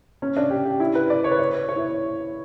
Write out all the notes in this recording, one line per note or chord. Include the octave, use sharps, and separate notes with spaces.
C#4
D4
G4
G4
E4
B4
D5
C#5
B4
C#5
C#5
E4